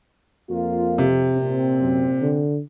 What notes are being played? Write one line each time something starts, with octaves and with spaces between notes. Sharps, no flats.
F2 A#3 F4
C3
A#2 C4
F#2
D3